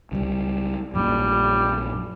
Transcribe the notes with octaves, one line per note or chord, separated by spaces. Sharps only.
C#2 F#3 G3
A#1 F#2 A#2 G3